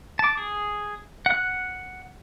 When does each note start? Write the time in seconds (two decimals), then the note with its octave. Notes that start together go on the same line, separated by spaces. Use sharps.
0.19 A5 D6
0.37 G#4
1.26 F#5 F#6